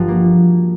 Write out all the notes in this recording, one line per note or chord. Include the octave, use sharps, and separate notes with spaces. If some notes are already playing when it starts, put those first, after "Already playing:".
Already playing: G1 F3 F#4
A#3